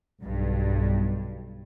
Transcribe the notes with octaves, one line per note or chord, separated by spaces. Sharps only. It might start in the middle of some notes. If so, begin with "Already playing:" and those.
B1 G2